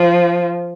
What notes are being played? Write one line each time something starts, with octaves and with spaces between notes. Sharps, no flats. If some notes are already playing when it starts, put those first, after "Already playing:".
Already playing: F3